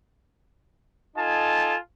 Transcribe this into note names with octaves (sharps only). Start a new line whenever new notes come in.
D#4 F4 A4 D#5 G#5 A5